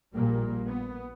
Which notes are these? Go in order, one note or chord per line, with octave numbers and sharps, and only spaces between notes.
A#1 A#2 G3 A#3
B3